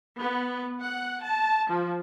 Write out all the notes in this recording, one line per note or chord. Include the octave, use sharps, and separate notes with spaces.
B3
F#5
A5
F3